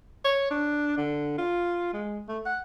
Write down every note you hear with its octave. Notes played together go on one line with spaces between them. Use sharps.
C#5
D4
D3
F4
G#3
A3
F#5